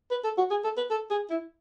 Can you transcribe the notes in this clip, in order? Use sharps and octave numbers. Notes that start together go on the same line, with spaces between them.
B4
A4
F#4
G#4
A4
B4
A4
G#4
E4